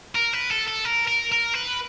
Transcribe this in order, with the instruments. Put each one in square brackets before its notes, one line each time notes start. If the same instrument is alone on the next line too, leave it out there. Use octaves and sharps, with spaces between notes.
[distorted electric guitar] A#4
B4
A4
A4
A#4
A#4
A#4
B4